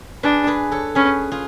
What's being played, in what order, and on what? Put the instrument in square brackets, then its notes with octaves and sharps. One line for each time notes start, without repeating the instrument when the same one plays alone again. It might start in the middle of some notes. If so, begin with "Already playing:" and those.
[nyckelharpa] D4 [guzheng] G#4 B4
[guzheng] G#4 B4
A4 C#5
[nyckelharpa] C#4 [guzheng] G#4 B4
[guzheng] F4 G#4